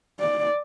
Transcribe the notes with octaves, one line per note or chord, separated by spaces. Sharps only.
D5